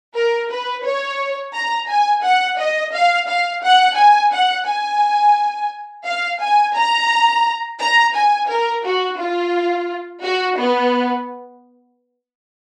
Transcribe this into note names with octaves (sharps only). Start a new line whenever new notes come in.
A#4
B4
C#5
A#5
G#5
F#5
D#5
F5
F5
F#5
G#5
F#5
G#5
F5
G#5
A#5
A#5
G#5
A#4
F#4
F4
F#4
B3